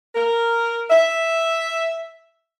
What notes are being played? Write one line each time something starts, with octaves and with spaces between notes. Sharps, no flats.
A#4
E5